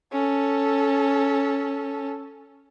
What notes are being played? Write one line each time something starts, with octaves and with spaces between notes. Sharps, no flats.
C#4 A4